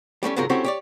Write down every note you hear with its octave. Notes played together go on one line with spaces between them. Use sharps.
G3 A3 C4 C#4
D#2 G#2 C3 F#3 F4 A#4
A3 C4 C#4 E4 F#4 G4
G4 C#5 D5